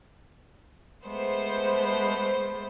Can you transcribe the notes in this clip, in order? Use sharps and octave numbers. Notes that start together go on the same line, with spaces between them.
G#3 A3 B3 C5